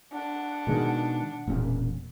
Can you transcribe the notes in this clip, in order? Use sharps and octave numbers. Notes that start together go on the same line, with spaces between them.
D4 F#5
B2 D#3 G#3
E1 A#2 C#4